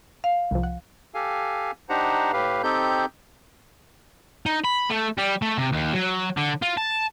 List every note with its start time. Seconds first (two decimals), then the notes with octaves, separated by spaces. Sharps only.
0.24 F5
0.51 C2 F3
0.63 F#5
1.15 G4 A4 F5 G#5
1.89 D4 D#4 G4 C5 F#5 A#5
2.33 A2 G4 B4 F5
2.63 C4 D#4 G4 A4 G6
4.46 D#4
4.65 B5
4.90 A3
5.18 G3
5.42 A3
5.57 C3
5.72 D#2
5.94 F#3
6.37 D3
6.62 F4
6.77 A5